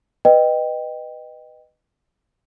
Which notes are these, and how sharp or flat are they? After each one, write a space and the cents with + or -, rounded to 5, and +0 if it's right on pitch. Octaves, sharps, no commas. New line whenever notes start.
B4 +0 D#5 -15 G5 +0